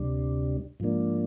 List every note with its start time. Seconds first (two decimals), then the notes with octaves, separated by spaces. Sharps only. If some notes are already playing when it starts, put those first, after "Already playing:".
Already playing: D2 C3 G3 D4
0.80 G#2 F3 A#3 D4